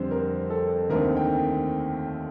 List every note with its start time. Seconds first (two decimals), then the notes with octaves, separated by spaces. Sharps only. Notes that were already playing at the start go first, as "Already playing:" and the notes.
Already playing: F2 D3 G3 C4 C5
0.11 A#4
0.50 A4
0.90 D#2 D3 A3 C4 A#4
1.17 G5